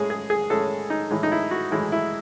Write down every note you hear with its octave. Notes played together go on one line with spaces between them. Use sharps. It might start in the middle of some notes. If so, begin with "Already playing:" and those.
Already playing: A2 G#3 C#4 G#4
G#4
G#4
A2 G#3 C#4 A4
D#4
A2 E3 G#3
D#4
E4
F#4
A2 E3 G#3 E4
E4